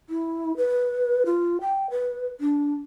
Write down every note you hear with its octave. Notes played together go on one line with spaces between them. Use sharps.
E4
B4
F4
G5
B4
D4